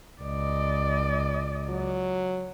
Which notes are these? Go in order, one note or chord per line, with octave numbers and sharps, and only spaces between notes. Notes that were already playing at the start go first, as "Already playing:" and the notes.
C#2 D5 D#5
F#3